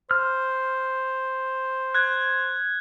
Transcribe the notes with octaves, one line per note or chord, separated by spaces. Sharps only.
C5 F6
F#6 G#6